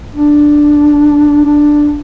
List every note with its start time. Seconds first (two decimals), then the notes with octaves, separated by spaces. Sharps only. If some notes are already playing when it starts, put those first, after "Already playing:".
0.15 D4
1.46 D4